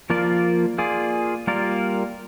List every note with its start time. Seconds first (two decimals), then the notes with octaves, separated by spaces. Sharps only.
0.10 F3 A#3 F4 A#4 D5
0.78 A#3 F4 G#4 D5
1.47 G3 A#3 F4 A#4 D5